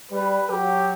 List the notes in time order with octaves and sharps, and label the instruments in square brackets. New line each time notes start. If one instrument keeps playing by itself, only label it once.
[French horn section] G3 [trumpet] B4
[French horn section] F#3 [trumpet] G4